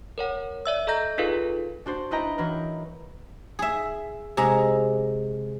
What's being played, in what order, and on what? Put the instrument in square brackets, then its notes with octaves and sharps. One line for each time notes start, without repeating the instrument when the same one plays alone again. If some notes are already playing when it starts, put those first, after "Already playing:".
[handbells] A#4 C#5 F#5
D5 E5 E6
A4 D#5 A#5 G6 A#6
D#4 F4 G#4 A4 B4 F5
[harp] D4 F#4 C5 A6
D#4 E4 B4 D#5 G5 A#5
E3 F#3 D#4 A#4 B4
[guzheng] G#4 E5
C3 G#3 G#4 A#5